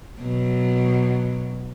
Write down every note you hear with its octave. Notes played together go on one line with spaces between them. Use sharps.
B2 F#3